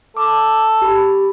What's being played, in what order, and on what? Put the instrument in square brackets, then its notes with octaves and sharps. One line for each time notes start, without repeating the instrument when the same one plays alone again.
[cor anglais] A4 [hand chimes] D6
[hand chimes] G4 B5